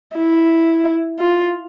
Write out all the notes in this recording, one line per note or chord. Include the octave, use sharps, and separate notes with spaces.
E4
F4